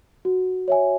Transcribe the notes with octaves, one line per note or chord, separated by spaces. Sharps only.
F#4
C#5 E5 G#5